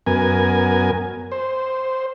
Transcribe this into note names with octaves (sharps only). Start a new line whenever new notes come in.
F#2 B3 A#4 G#5
C5